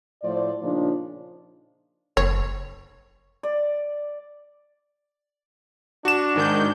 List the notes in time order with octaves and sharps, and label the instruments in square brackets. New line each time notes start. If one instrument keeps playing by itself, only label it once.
[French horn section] A2 F3 C5 D5
A#2 C#3 F3 D4 D#4 D5
[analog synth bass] F#1 [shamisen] C#5
[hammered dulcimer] D5
[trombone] D4 [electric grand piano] F#4 E7
[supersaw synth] G#2 D#3 G6